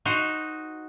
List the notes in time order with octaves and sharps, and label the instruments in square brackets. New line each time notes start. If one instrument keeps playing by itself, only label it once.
[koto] D#4 F#4 C5